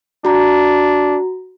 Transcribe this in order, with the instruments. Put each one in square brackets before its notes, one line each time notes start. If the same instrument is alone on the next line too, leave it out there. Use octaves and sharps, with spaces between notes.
[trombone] D4 [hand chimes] F#4 A#5